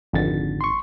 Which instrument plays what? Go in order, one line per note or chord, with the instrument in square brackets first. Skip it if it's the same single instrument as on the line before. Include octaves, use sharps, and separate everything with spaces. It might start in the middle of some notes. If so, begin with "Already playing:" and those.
[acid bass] G#1 [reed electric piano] F2 D3 A6
[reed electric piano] C6 C#6